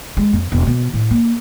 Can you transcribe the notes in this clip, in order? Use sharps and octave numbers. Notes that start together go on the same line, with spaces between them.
G#3
F2
E1
B2
A2
A#3